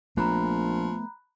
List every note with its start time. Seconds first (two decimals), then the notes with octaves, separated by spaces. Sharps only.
0.17 A#1 F3 A3 B3 A#5 B5 F#6